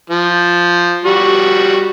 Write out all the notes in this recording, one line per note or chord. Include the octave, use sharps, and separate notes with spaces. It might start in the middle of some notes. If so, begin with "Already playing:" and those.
F3
G3 F#4